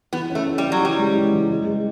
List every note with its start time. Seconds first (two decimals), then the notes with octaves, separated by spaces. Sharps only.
0.13 E3 B3
0.30 C#4
0.35 A3
0.46 C#4
0.58 G3
0.64 C#4
0.72 F#3
0.81 E3 G3
0.99 G#3
1.16 E3
1.33 E3
1.50 G#3
1.67 G#3